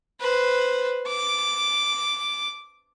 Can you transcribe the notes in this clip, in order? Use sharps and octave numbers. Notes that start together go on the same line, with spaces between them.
B4 C5
D6